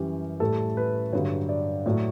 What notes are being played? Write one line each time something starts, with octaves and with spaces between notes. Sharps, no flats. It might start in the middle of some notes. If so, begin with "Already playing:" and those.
Already playing: F#2 E3 G3 G4
A2 G3 A4
B4
G2 D3 F#3 C#5
D5
A2 F#3 A3